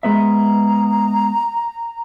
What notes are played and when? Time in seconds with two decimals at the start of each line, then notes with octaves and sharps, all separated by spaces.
0.03 G#3 B3 E5 A#5